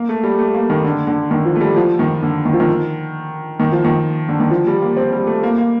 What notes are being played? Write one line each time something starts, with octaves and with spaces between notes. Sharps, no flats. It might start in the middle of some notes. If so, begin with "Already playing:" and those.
Already playing: A#3
A3
G3
A3
A#3
D#3
D3
D3
D#3
F3
A3
G3
F3
D#3
D3
D#3
F3
D#3
D#3
F3
D#3
D3
D#3
F3
G3
A#3
C4
G3
A3
A#3
A#3